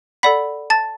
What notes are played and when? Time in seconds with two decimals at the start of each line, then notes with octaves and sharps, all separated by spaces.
0.23 A4 D5 F#5 B5 B6
0.70 A5 A6